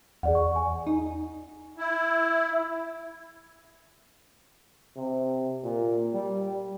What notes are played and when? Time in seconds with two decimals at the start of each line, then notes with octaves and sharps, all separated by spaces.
0.23 E2 G#4 D5 F#5
0.35 C#6
0.56 G#5
0.87 D#4
1.78 E4
4.97 C3
5.64 A#2
6.14 G3